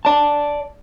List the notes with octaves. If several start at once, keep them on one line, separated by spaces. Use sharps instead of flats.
D5 A5